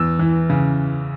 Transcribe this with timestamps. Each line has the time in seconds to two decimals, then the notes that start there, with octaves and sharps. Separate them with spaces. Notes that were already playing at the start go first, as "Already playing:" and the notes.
Already playing: E2 E6
0.19 E3
0.50 C#3